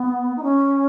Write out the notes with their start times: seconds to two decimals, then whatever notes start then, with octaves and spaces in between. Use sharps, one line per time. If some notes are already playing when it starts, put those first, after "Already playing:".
Already playing: B3
0.36 D#4
0.42 C#4